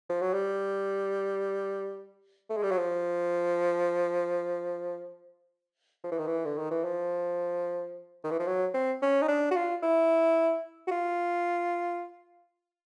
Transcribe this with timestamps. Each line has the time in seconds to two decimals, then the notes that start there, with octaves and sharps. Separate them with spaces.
0.09 F3
0.22 F#3
0.33 G3
2.50 A3
2.56 G#3
2.63 G3
2.71 F#3
2.78 F3
6.04 F3
6.12 E3
6.18 D#3
6.27 E3
6.45 D3
6.58 D#3
6.71 E3
6.84 F3
8.24 D#3
8.31 E3
8.39 F3
8.47 F#3
8.74 C4
9.02 C#4
9.22 D#4
9.28 D4
9.51 F#4
9.56 F4
9.83 E4
10.87 F#4
10.91 F4